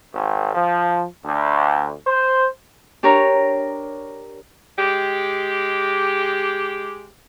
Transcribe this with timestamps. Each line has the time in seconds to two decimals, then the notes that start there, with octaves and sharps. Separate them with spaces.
0.14 G#1
0.55 F3
1.25 D2
2.06 C5
3.03 D4 G4 A#4 C#5 A#5
4.78 G#3 G4